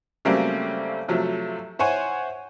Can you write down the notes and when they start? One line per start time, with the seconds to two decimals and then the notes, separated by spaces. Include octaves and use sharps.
0.25 C#3 F#3 G3 A3 A#3 C4
1.08 C3 F3 F#3 A3
1.79 E4 C5 C#5 F#5 G#5